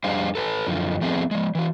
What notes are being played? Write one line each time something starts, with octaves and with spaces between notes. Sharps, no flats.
F2 G3 D4 G#4 C5 F5
A4 B4 F#5 A5
F#2 D3 F3
F3 A3 B3 C4 G#4
F3 G#3
E3 F#4